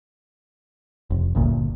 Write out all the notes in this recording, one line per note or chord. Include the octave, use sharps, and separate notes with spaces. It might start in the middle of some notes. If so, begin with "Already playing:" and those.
F1
G1 D2 A#2